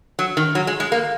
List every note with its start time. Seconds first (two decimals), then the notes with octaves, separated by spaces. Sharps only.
0.19 F#3
0.37 D#3
0.55 F#3
0.67 G#3
0.80 G#3
0.92 A#3